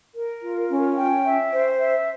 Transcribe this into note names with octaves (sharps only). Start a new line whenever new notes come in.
A#4
F4
C#4
G5
E5
C5
E5